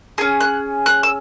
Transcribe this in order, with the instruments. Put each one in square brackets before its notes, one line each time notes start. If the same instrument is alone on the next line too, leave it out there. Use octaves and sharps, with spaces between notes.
[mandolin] C#4 G#4
F#6
F#6
E6